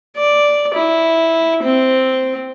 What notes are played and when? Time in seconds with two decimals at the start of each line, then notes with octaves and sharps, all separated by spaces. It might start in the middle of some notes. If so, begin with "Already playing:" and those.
0.17 D5
0.74 E4
1.63 C4